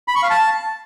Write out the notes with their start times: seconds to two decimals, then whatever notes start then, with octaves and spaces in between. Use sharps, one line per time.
0.08 B5
0.15 C#6
0.23 F5
0.30 A5